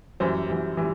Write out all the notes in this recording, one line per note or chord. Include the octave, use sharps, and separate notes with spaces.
F#2 E3 G3 C5
F#2 E3 G3
E3 G3